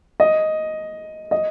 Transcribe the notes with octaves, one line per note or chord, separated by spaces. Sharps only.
D#5
D#5